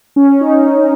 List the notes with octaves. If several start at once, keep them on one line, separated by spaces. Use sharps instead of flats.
C#4
D#4